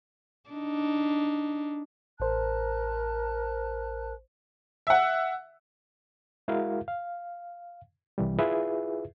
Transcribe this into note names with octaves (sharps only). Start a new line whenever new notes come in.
D4 D#4
A1 A#4 C5 A5 F#6
E5 F#5
G#3 E4 F#4 A#4 F5
F5
C2 E3 G3
E4 F4 G#4 B4 E5